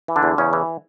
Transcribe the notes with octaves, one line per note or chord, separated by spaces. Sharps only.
E3
D3 D4
E2
E2 C#3 C#4
E3